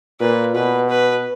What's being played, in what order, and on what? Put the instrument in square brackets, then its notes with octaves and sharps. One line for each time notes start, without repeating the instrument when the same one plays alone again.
[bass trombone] A#2 [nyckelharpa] B4
[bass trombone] B2 [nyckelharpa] B4
[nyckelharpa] B4